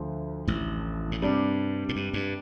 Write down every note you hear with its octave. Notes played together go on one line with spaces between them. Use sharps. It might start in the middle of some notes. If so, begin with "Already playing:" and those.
Already playing: D2 D3 F3
A1 A2
A2
G2 C3 G3 D4
A2
G2
G2